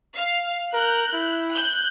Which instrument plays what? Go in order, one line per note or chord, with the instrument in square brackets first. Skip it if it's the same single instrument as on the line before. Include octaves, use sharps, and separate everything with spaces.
[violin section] F5
[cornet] A#4 [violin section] F#6 G6
[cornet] E4
[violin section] F#6 G6